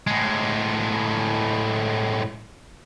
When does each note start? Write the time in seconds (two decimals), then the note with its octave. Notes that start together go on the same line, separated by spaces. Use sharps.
0.07 A2 G#3